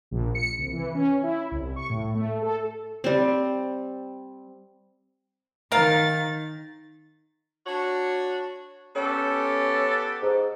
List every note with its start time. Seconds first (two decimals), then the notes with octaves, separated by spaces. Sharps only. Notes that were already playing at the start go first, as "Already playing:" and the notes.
0.11 A#1
0.35 C#7
0.58 C2
0.73 E3
0.95 C#4
1.23 E4
1.51 C2
1.76 C#6
1.90 A2
2.15 A3
2.42 A4
3.04 G3 C4
5.72 D#3 A#4 F5 A6
7.66 D4 F#4 C#5
8.96 B3 C#4 G4 A4
10.22 G#2